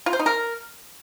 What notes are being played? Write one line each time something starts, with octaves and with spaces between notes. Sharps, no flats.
F4
C5
D#4
A#4